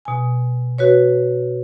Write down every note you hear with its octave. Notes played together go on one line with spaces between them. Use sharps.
B2 G#5
F#4 B4 C#5